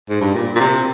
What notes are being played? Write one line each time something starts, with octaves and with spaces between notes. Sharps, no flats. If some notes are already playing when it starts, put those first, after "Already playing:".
G#2
G2
A#2
A#2
C3